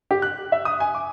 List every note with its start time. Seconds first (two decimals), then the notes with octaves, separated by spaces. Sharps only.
0.11 G4
0.22 F#6
0.52 E5
0.65 D#6
0.80 G#5
0.95 D6